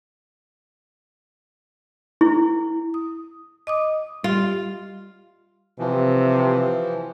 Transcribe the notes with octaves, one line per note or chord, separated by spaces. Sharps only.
E4
D#6
D#5 D6 D#6
G3 F4
C3 E3 F3